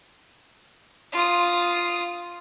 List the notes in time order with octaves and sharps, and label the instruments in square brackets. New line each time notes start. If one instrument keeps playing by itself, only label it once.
[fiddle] F4 D#6